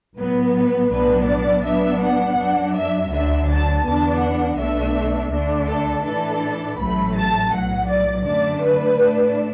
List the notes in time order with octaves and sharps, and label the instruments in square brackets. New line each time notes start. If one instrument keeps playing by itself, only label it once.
[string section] A2 F#3 B3 B4
B4
B1 A2 F#3 B3 D4 B4
D5
A2 F#3 B3 D4 E5
F#5
F#2 F#3 D4
E5
D2 D3 F#3 D4 E5
A5
E2 D3 B3 D4 A5
F#5
B1 B2 A3 D4 E5
D2 D3 A3 D4
A4
A2 E3 D4 A4
A1 A2 F#3 A3 B5
A5
B1 A2 F#3 F#5
D5
F#2 D3 A3 D4 D5
B4
A2 A3 D4